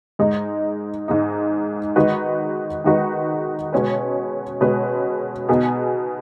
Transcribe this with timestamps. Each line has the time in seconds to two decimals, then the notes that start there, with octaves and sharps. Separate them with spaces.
0.19 G#2 G#3 D#4
1.08 G#2 G#3 D#4
1.96 D#3 G#3 D#4 F#4 B4
2.84 D#3 G#3 D#4 F#4 B4
3.73 B2 G#3 C#4 B4
4.61 B2 G#3 C#4 B4
5.49 B2 B3 D#4 G#4